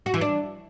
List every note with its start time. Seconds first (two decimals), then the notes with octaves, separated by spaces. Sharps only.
0.06 F#4
0.14 E3
0.21 D4